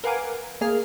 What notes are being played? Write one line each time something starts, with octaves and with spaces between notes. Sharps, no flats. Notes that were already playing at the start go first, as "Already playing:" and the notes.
A#4 B4 F5 F#5 G#5 D6
A#3 G#4 F6